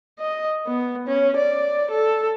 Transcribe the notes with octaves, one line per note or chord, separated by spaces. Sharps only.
D#5
B3
C#4
D5
A4